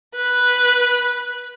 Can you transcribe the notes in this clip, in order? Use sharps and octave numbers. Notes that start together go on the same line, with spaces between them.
B4